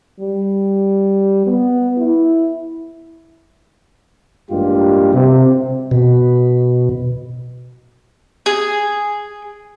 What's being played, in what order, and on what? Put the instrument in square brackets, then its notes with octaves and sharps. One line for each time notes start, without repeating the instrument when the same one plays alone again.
[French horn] G3
B3
E4
[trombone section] A1 G2 G#3 A#3 F4 G4
C3
[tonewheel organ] B2
[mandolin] G#4